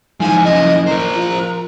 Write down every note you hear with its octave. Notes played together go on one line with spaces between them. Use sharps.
G#2 F3 E4 G#5
F#1 D#5
A#4 C5 A#5
F3